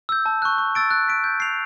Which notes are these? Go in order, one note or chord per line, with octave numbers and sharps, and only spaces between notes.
E6 G6
A5
C#6 F#6
C#6
E6 A6 D7
F#6
B6 D7
G6
C7 F7